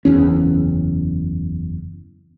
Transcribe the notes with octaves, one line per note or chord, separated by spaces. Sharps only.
F#1 E2 C#4